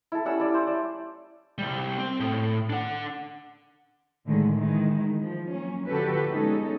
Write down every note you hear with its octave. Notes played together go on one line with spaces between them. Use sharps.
E4 A4
G3 C#4 F#5 E6
E4 D5
C5
D5
C2 G3
C4
A2
D4 F#5
A2 D3 D#3 G#3 A3
D#3 E3 G#3
F3
F#3 A#3 C#4
D3 F3 F#4 G4 A4 B4
G3 G#3 B3 C#4 D#4 A4